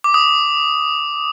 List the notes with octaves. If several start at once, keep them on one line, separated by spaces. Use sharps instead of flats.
D6
D#6